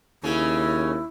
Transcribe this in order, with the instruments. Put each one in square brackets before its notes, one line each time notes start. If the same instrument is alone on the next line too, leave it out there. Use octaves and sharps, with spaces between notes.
[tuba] D#2 [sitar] C#3 C#4 [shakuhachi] E4